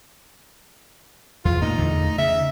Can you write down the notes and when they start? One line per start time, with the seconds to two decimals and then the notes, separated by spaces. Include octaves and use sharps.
1.45 E2 F4
1.61 A#2 A3 D#4
1.78 E2 D3 A3
2.18 C#3 E5